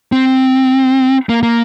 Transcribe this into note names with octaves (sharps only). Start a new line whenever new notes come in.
C4
A#3
A#3